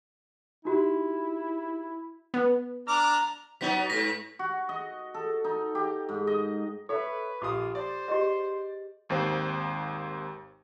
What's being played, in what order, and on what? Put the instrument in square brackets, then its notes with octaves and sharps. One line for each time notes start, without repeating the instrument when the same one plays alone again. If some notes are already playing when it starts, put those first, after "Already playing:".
[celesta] D#4 F#4 G4 [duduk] E4
[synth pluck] B3
[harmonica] D4 D6 F6 [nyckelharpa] A#5
[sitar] F#3 B3 D#4 [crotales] B6
[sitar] G#2 [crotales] A#6 B6
[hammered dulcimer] F#4
D#5
A4
D#4
G4
G#2
D#5
[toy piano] A4 [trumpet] B4 [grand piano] C#5 E5
[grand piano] A#1 F5 D#6 [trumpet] F4 [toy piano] G4 D6
[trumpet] C5 [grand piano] D5
[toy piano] G4 G#4 D#5
[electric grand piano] G#1 D#2 C4 C5